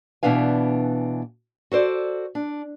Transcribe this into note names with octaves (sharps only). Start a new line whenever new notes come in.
B2 E3 B3 D4 F5 G#5
F#4 A4 C5 D5
D4